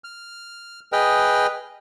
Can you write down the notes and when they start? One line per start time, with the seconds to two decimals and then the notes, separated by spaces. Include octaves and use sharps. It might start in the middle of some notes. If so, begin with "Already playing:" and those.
0.04 F6
0.92 G#4 B4 D#5 G5 F6